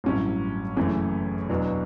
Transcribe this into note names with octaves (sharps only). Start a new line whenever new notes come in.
A1 G2 F#3 C#4 E4
F#1 F#2 E3 A3 C#4
E2 B2 F#3 B3 D4